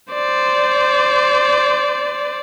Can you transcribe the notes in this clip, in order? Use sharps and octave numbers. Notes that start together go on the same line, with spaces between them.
C5 D5